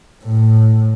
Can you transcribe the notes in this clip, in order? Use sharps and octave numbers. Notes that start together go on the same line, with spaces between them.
A2